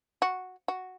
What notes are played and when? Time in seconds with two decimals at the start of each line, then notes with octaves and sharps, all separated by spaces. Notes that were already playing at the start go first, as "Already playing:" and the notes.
0.22 F#4
0.68 F#4